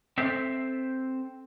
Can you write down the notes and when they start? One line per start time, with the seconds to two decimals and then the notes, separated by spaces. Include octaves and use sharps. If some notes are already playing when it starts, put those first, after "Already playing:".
0.18 C4 A4 C5 E5